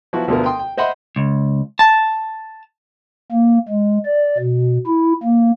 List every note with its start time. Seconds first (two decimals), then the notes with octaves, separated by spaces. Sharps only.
0.13 F3 F#3 B3 E4 F#4
0.28 D2 B2 F3 B3 A#4
0.45 G5 C6 D#6
0.59 G5
0.77 C5 D#5 E5 F#5 B5 C6
1.16 C#2
1.79 A5
3.32 A#3
3.69 G#3
4.05 D5
4.38 B2
4.87 E4
5.24 A#3